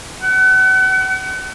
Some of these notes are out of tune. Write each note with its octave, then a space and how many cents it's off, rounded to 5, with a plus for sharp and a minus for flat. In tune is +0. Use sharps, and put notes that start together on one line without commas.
F#5 +35